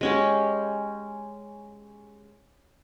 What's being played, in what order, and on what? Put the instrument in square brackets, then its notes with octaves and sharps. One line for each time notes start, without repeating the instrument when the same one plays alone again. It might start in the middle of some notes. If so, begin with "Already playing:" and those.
[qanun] G#3 C#4 G4